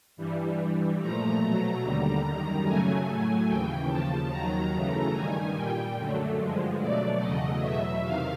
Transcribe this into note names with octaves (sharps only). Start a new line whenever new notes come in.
G2 E3 G3
G2 E3 G3
A#2 F3 A3 A#5
B2 F#3 A3
D#2 D3 G3 A#5
F#2 D#3 G3
F#2 C#3 F#3 A3 G#5
A2 F#3 A3
D#2 C#3 E3 G5
D#2 C#3 F3 A5
D#2 D#3 F#3 A#5
F#2 C#3 E3 A3 A#5
G2 D#3 G3 G#5
A#2 G3 G5
F#2 D3 F#3 A3
G2 D3 F3 G#3
B2 F#3 A3 D5
E2 C#3 F#3 A3 D#5
E2 B2 F#3 E5
E2 C3 D#3 F5